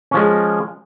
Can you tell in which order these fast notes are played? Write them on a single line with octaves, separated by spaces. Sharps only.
C#4 F3 G#3